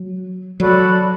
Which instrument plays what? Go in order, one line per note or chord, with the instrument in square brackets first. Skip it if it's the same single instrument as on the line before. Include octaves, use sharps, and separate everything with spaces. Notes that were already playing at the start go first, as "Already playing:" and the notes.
Already playing: [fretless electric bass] F#3
[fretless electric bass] F#3 [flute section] F#4 A4 D5 B5